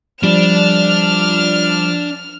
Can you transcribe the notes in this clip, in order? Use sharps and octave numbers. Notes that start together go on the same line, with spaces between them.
F3 G3 D4 F6 F7